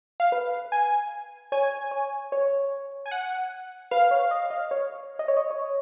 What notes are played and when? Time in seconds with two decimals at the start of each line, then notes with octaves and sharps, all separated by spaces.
0.20 F5
0.32 B4
0.72 G#5
1.52 C#5 G#5
1.91 C#5
2.32 C#5
3.06 G#5
3.11 F#5
3.91 B4 F5
4.11 C#5
4.31 D#5
4.50 D#5
4.71 C#5
5.19 D#5
5.28 C#5
5.37 D#5
5.50 C#5